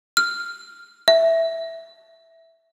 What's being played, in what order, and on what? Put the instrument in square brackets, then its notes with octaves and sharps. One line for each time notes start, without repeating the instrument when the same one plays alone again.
[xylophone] F6
E5